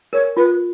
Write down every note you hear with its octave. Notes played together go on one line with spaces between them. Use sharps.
A#4 C#5
F4 B4